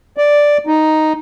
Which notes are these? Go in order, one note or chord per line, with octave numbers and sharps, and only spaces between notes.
D5
D#4